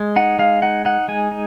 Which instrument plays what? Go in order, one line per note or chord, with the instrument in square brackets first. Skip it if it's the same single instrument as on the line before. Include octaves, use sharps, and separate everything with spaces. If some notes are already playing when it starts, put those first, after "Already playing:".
Already playing: [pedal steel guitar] G#3
D#4 F#5
G#3 F5
D#4 F#5
D#4 F#5
G#3 G#5
D#4